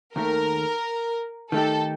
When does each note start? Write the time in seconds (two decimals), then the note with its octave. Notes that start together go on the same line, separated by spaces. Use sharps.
0.15 D#2 D#3 A3 A#4
1.52 D#3 A3 D#4 G4 A4